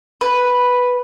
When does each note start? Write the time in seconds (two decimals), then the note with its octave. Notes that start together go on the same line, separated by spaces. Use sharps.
0.21 B4